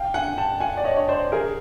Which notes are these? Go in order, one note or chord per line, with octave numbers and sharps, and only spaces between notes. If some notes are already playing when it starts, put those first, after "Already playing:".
Already playing: F5 G5
F#5 G#5
G5 A5
F#5 G#5
D5
C#5 D#5
C#5
C5 D5
G#4 A#4